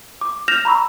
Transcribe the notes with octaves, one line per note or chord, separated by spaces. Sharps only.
D6
F6 G6 A#6 E7 F7
A#5 B5 C#6 E6